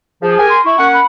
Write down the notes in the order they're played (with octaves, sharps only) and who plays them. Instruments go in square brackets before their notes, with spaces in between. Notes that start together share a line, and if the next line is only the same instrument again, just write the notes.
[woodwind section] F3 [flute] G#4
[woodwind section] G4 A#4 G#5
[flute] C6
[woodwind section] E4 [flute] C#6
[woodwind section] A#3 C#4 F#5
[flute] B5